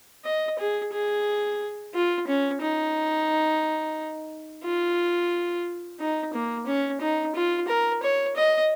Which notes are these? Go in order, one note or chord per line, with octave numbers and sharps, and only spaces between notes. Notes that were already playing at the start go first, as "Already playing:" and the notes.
D#5
G#4
G#4
F4
C#4
D#4
F4
D#4
A#3
C#4
D#4
F4
A#4
C#5
D#5